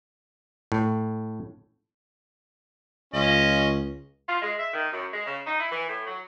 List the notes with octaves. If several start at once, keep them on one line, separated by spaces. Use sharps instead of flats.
A2
C#2 C#4 F4 D#5
F4
G#3
E5
D#3
F#2
G#3
C#3
D#4
E4
E3
A2
F#3